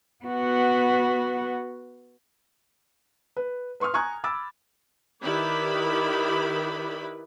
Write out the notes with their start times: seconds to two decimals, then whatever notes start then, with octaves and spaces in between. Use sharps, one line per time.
0.25 B3 F#4
3.37 B4
3.80 B4 C6 C#6 D#6 F6
3.94 G#5 A#5 C#6 D#6 F#6 G#6
4.24 B5 D6 E6 A6
5.22 D#3 E4 G4 B4 D5 B5